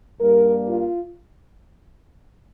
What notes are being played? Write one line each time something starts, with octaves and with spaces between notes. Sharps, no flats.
G2 G3 A#3 A#4
F4